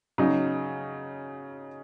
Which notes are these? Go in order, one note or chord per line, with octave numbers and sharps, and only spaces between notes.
C#3 F#3 D#4